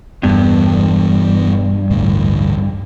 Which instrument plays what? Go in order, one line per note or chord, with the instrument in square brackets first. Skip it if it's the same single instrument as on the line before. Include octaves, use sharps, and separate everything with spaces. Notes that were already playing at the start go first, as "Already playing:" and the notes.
[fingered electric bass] E1 E2 B3 [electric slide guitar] G2
[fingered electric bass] A1 D2 A2